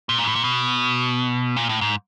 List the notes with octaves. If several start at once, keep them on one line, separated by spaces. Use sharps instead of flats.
A#2
G#2
A2
A#2
B2
A#2
A2
G#2